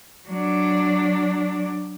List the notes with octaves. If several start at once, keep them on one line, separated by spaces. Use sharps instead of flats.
F#3 D4